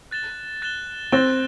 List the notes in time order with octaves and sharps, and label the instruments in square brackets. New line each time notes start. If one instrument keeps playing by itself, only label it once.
[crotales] F#6 A6 E7 G7
F#6 A6 E7 G7
[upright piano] C4 [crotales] F#6 A6 E7 G7